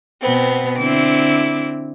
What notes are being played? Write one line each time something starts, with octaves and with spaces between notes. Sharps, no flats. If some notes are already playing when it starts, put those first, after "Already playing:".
B2 B3 C4
D3 C4 E4 D6